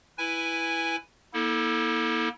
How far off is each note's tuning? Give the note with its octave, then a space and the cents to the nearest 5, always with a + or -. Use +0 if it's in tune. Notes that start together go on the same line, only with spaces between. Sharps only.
E4 +5 B4 +0 G#5 -5
A#3 +45 E4 -35 A4 +0